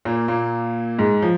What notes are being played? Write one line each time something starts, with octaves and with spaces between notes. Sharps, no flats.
A#2 A#3
A#2 A#3
G#2 G#3
F3